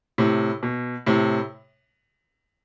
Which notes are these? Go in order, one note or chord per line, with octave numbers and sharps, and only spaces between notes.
A2 C3
B2
A2 C3